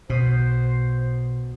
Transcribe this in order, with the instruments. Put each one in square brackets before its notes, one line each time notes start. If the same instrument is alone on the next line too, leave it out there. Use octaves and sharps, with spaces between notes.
[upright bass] B1 [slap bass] B2 [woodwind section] C5